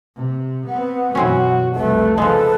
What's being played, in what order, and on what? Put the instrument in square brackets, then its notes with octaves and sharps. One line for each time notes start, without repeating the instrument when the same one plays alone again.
[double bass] C3
[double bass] B3 C4 [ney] F#5
[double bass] F#2 B2 [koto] E3 C4 C#4 [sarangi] F#4
[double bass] F1 C2 [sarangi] A3 [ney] B4
[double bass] C#3 [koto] F3 G#3 [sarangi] A4 [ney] B4